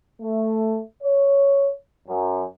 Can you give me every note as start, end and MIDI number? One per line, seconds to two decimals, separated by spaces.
0.21 0.80 57
1.03 1.71 73
2.08 2.43 42